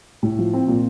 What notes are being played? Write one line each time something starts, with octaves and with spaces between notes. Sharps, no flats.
A2
F3
C4
A#2